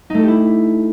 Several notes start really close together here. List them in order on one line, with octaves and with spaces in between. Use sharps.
D#4 A3 A4 G4 E4